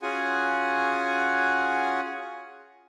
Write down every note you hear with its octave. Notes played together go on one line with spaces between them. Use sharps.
C#4 F4 F#4 G#4 F#5 G#5